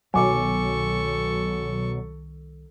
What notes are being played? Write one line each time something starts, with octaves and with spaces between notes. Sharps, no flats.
C2 B2 D#3 F#3 A4 G#5 C#6 D6